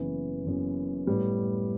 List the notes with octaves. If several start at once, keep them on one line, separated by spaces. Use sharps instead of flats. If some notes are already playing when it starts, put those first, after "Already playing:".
Already playing: F#1 F#2 E3 B3
F#1 F#2 E3 B3
A2 G3 B3